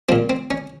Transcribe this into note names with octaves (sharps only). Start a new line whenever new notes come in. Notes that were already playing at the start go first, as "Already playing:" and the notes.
A#2 F3 C4
C4
C#4